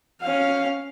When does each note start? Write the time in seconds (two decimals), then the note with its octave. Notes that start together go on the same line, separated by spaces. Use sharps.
0.22 C#4 F5